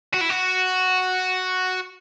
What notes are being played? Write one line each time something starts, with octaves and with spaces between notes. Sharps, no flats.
F#4
E4
F#4